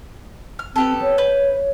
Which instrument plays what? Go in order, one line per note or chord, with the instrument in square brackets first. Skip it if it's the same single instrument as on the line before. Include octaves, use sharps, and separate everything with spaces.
[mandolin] F6
[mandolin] B3 G4 A4 [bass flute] C4
[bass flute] C#5
[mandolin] B4 G6